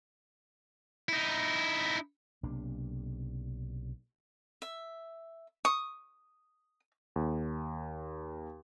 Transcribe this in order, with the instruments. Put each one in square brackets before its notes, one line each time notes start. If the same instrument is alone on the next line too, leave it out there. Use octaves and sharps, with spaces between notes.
[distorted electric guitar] D#4 E4
[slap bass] B1 C3 A#3 D4
[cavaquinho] E5
[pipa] C#6 [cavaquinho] D#6
[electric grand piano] D#2